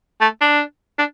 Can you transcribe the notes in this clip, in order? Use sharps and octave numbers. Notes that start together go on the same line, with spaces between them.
A3
D4
D4